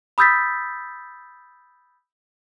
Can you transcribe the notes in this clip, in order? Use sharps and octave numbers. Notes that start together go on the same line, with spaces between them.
B5 D#6 E6 G6 A6 B6